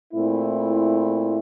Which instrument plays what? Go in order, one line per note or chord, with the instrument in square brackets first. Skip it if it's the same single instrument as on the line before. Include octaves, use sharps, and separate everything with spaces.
[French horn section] A#2 A3 C4 E4